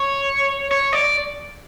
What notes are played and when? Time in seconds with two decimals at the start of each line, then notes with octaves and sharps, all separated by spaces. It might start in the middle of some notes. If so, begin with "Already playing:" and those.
Already playing: C#5
0.71 C#5
0.93 D5